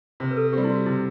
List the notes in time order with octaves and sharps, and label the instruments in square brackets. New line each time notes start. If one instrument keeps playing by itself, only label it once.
[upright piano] C3 [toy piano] C5
[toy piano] B4
A4
[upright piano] G3 C4 [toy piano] G4
[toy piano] E4
F#4
[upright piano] C3 [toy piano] E4